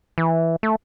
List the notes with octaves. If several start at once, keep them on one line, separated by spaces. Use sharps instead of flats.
E3
A3